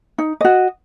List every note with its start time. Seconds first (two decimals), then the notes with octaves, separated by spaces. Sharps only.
0.18 D#4
0.41 F#4 D#5